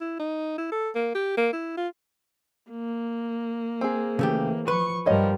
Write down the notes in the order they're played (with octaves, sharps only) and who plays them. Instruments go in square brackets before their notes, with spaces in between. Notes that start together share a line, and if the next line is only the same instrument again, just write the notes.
[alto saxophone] E4
D#4
E4
A4
A#3
G4
A#3
E4
F4
[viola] A#3
[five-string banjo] C4 G#4
[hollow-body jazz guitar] C#3 A3 G4 [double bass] E3
[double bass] F3 [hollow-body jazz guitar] B4 [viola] C#6
[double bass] G2 G3 [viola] F3 A#4 [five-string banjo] C#5 D#5 F#5